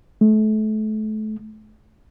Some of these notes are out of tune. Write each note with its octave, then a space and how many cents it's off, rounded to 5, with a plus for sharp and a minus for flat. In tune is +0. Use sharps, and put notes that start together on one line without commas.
A3 -30